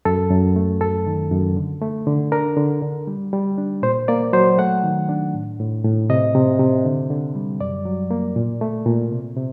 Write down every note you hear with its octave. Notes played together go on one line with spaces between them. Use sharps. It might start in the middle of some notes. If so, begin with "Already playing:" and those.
F#2 A4
F#2
A3
F#2 A4
D#3
F#2
D3
A3
D3
D4 A#4
D3
D3
G3
G3
D4
A#2 C5
A#3 D5
F#3 C5
A3 F#5
D#3
D4
A2
A2
A2
C3 D#5
C3
C3
D3
D3
G3
F#2 D5
F#3
A#3
A#2
A3
A#2
C3
C3